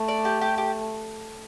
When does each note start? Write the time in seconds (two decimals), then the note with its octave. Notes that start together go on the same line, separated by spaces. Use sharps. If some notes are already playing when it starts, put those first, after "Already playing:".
Already playing: A3
0.08 D5
0.25 G4
0.41 G4
0.58 G4